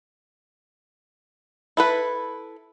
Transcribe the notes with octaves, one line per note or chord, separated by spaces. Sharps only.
E4 A4 B4